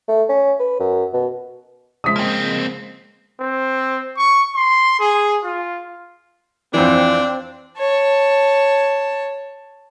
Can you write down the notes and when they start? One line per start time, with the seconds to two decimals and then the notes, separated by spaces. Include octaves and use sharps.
0.08 A3
0.29 C#4
0.59 B4
0.80 F#2
1.13 B2
2.04 C#3 F3 G#3 D#6 B6
2.16 A#3 C4
3.40 C4
4.17 C#6
4.56 C6
5.00 G#4
5.44 F4
6.74 F2 E3 C4 D4
7.78 C#5 A5